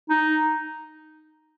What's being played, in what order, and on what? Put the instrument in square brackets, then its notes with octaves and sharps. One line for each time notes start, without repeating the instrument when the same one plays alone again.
[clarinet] D#4